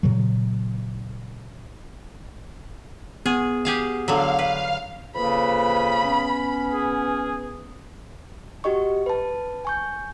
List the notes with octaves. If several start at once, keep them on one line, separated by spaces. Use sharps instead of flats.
A#2 C#3 F#3
B3 G#4
G4 G#4 F5
D3 F#3 F5
B4
F2 C#3 A#3 B4 B5
B3 C#4
G#4
F#4 G4 D#5 C#6
B4 A5
G#5 C#6 G6